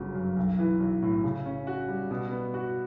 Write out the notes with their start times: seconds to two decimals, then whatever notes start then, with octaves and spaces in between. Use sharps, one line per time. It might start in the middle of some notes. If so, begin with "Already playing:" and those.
Already playing: G1 C#3 F#3
0.15 F#2
0.37 B1
0.59 E3
0.80 B1
1.02 A2
1.24 C#3
1.46 C#4
1.67 F#4
1.88 G3
2.11 B2
2.31 B3
2.54 F#4